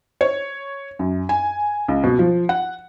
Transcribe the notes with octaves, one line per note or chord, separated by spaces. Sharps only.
C#5
F#2
G#5
C#2
B2
F3
F#5